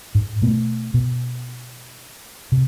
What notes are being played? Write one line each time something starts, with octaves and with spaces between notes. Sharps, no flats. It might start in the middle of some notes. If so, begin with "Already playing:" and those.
G#2
B2 A3 B3
B2
C3